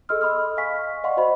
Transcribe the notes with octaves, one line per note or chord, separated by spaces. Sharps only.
G#4 A4 D#5 C6 E6 F6
D#5 B5 C6 D#6 F6
D#5 F5 G#5 C#6 B6
D5 D#5 F5 F#5 C6 C#6
F#4 C5 D#5 B5